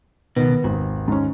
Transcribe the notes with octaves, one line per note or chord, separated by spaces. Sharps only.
C#2 B2 D#3 B3
G#1 D#2
G#2 C#4